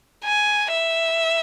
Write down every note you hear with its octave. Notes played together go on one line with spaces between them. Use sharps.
G#5
E5